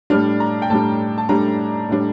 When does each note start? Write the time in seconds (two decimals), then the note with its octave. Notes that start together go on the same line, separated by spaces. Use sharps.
0.10 A2 G3 D4 F6
0.40 A#5
0.62 G5
0.70 A2 G3 D4 A5
1.18 A5
1.29 A2 G3 D4 A#5
1.89 A2 G3 D4